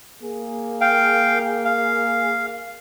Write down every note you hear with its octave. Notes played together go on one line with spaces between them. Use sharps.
A#3 G#4
F5 G5
F5